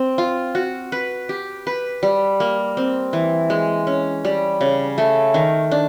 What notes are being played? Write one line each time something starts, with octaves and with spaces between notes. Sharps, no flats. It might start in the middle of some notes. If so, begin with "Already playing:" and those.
Already playing: C4
F4
F#4
B4
G4
B4
G3
A#3
C4
E3
G#3
C#4
G3
C#3
A3
D#3
D4